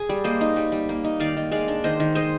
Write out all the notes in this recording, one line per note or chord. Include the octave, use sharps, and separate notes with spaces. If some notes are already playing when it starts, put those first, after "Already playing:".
Already playing: G#4
G3
A#3 C5 D#5
D#4
G3
G3
A#3
D#4
D#3 D5 F5
D#3
G#3 D5 F5
D4
D#3 C5 D#5
D#3
G#3 C5 D#5